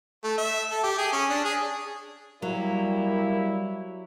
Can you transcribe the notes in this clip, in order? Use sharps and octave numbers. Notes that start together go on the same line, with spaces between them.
A3
E5
A4
G4
G#4
C#4
D4
G#4
F#3 G3 A#3 E4